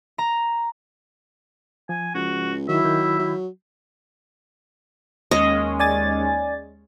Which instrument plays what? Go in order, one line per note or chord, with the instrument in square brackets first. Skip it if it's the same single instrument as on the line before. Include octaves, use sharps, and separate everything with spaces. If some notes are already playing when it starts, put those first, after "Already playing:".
[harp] A#5
[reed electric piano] F3 [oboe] G#5
[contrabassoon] C#2 [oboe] F#4
[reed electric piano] D#3 [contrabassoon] F#3 [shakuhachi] E4 [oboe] E5
[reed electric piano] D#3 G6
[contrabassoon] F#3
[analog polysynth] D#2 G#3 C#4 [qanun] D#5
[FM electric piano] D5 G#5 A6